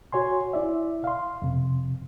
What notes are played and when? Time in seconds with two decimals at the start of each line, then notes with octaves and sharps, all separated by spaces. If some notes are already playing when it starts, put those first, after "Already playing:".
0.12 F#4 C#5 G#5 C6
0.53 E4 D5 E5
1.04 F5 C6
1.42 F2 C3